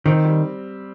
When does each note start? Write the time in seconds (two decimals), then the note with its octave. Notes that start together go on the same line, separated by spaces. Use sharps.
0.05 D#3 C4
0.25 G3